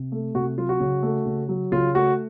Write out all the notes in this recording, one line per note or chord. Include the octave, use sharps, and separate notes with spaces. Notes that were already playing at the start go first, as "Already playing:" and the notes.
Already playing: C3
A3
C3 F#4
F#3 F4
F#4
C#3
A3
C#3
F#3
C#3 F4
A3 F#4